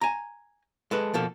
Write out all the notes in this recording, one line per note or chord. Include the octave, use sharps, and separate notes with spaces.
G#5 A#5
G#3 A4 B4
B2 F3 A#3 A4